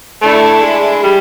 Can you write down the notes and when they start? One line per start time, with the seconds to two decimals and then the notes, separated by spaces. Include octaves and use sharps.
0.22 A3 D4 E4
0.62 G#3
1.03 G3